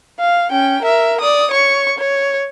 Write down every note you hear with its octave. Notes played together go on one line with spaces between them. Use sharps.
F5
C#4 G5
A#4 E5
D5 D#6
C#5 C#6
C#5